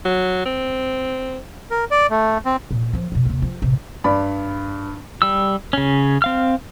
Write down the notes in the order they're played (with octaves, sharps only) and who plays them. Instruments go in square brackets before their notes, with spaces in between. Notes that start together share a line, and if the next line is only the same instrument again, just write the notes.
[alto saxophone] F#3
C4
[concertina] A#4
D5
A3
C4
[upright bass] A#2
F3 F#3
F2 B2
D#2 C3
F3
A1 C3
[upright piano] G2 D5 B5
[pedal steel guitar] G3 E6
C#3 C#4
C4 F5 F6